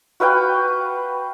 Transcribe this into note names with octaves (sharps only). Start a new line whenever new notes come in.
F#4 B4 F5 G5